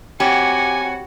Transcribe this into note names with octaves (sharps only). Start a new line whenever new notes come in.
C4 F#4 G4 C#5 F#5 G#5 B5